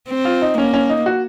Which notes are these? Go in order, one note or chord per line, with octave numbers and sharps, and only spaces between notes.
C4
F4
D#4
A#3 C#4
C#4
D#4
F#4